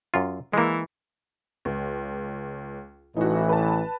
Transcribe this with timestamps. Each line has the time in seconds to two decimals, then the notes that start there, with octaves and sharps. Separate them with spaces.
0.14 F#2 F4
0.54 E3 G#3 A#3
1.65 C#2
3.17 A1 A2 E3 D#4 F#4
3.49 B4 A5